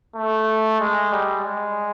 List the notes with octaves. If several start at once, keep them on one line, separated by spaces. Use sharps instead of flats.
A3
G#3
G3
G#3